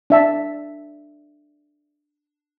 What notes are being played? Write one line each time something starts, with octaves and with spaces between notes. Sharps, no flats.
D4 E5 A5